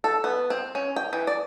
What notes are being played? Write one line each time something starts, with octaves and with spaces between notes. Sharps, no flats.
A4
B3
C4
C#4
G5
E3
D5